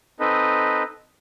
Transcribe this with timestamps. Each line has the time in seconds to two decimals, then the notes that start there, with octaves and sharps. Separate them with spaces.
0.20 C4 D#4 A4 B4 D#5